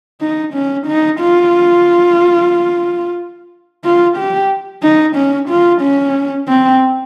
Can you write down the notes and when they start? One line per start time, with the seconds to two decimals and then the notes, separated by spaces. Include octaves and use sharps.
0.21 D#4
0.54 C#4
0.87 D#4
1.20 F4
3.84 F4
4.18 G4
4.83 D#4
5.16 C#4
5.49 F4
5.82 C#4
6.48 C4